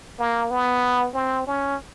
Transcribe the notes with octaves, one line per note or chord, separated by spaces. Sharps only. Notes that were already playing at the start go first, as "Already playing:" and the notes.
A#3
B3
C4
C#4